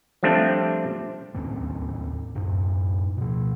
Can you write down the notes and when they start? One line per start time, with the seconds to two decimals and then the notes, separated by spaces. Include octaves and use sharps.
0.23 F3 G3 A3 C4 D4
1.35 D#2 A2 C4 C#4
2.35 F#2 A2
3.17 B2 F3